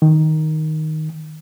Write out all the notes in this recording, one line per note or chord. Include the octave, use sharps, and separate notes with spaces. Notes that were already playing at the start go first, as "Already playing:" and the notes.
D#3